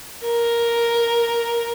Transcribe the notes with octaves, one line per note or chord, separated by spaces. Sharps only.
A#4